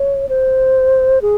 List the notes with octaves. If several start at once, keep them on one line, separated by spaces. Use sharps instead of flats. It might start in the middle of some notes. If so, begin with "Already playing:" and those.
Already playing: C#5
C5
G#4